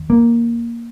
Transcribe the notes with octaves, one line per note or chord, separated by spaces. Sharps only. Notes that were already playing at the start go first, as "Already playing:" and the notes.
Already playing: D#2
A#3